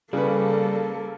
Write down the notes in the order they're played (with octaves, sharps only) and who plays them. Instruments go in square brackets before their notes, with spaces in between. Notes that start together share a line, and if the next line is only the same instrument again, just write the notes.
[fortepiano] C#3 B4 [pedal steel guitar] G3 [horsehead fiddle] A#3 A4